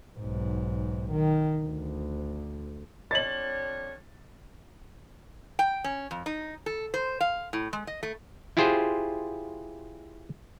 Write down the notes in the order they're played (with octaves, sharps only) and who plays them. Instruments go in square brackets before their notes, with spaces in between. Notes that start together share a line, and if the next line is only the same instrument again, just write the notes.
[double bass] B1 G#2
D#3
D2
[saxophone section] F2 D4 C#5 [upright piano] A6 F#7
[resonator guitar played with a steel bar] G5
C#4
F2
D#4
A4
C5
F5
A2
G#3
D#5
A3
[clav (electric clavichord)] E4 F4 G4 G#4 C5